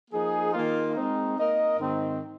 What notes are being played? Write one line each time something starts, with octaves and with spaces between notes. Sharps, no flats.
F3 A#3 D#4 G#4
D#3 A#3 F4
G#3 C4 D#4
A#3 D#4 A#4 D#5
G#2 D#3 C4